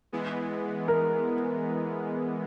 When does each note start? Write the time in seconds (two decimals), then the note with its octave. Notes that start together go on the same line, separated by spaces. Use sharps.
0.12 E3 G#3 B3
0.88 A#4